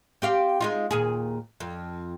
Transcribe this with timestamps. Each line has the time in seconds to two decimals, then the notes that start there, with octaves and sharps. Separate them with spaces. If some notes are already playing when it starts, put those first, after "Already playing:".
0.22 C4 G4 F5
0.61 G#3 D#4 F4
0.91 D#2 A#2 G#4
1.60 F2